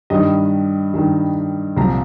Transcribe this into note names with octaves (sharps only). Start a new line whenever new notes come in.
G2 D#3 G3 D#5
G2 D#3 G3
C2 A#2 F3 A#5